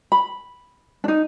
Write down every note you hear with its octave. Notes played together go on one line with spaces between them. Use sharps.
B5
D4 D#4